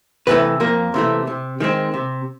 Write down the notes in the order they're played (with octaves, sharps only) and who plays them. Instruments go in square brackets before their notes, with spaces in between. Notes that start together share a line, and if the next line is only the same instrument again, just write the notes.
[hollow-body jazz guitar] C3 E3 A3 B3 B4
F2 A#3 A#4
C3 E3 A3
C3
D#3 G#3 C4
C3